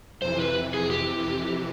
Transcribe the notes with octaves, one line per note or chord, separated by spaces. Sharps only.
F2 C3 E3 C5
B4
G#4
G4